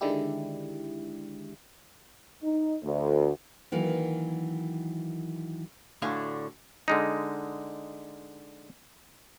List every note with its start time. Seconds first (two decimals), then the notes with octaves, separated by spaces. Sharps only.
0.01 D3 D#3 G#3 D4 E4 G4
2.42 D#4
2.82 D2
3.72 D#3 E3 F#3 A#3
6.02 D2 A2 D3 F5 G#5
6.88 D3 G#3 D#4